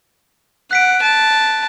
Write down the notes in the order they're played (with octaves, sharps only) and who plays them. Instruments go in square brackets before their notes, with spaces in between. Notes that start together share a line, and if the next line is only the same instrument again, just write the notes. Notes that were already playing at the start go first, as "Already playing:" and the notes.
[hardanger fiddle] F#5 [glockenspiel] F#6 B6 D7
[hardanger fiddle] A5